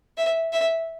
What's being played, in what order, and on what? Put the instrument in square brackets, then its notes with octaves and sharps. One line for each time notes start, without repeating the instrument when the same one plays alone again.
[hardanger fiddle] E5
E5